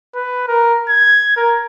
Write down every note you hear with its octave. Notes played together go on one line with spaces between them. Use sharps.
B4
A#4
G#6
A#4